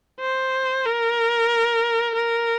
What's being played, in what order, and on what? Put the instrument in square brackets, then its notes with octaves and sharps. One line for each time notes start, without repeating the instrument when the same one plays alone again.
[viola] C5
A#4
A#4